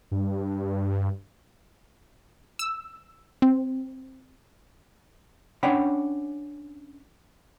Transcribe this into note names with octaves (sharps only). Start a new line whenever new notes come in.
G2
E6
C4
C#4 D4 C#5 F#5 G5 B5